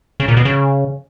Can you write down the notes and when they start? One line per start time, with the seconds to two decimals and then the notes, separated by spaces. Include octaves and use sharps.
0.20 C#3
0.28 A#2
0.37 B2
0.45 C#3